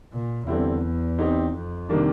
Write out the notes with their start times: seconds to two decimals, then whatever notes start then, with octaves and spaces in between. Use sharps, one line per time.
0.12 A#2
0.47 E2 D3 G3 C4 E4
1.18 C4 D#4 G4
1.54 F2
1.89 C3 D#3 G3 A#3 D4